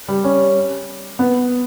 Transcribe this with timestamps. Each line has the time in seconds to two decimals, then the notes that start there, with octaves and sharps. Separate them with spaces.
0.08 G3
0.24 C#4
1.19 B3